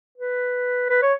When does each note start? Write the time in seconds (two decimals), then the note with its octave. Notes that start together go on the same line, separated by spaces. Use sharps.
0.18 B4
0.90 B4
1.02 C#5